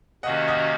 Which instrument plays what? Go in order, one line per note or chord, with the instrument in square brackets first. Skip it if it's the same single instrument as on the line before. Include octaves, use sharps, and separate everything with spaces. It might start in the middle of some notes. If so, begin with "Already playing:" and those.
[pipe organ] C3 D#3 A#3 C#4 F#4 [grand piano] D#5 F#5
[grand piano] D#5 F#5